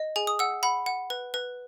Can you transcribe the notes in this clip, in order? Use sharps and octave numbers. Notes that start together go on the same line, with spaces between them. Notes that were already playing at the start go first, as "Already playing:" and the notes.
Already playing: D#5
G#4 G#5
D#6
F#5 E6
F#5 B5
F#5
B4
B4